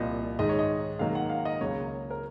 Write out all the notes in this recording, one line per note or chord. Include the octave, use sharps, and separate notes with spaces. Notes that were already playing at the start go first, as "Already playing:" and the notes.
Already playing: C2 A#2 F3 A#3 D#5
G#2 D#3 G#3 D#5
C#5
D#5
G#2 D#3 F#3 A#3 F5
F#5
F5
D#5
C#2 C#3 F#3 A#3 C#5
A#4